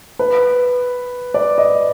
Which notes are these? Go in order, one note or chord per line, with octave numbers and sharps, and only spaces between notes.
B4
D5
D#5